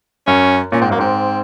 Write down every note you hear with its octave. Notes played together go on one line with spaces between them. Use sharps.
F#2 C#4
A#2 C#4
G#2 C4
F#2 A#3
G#2 C4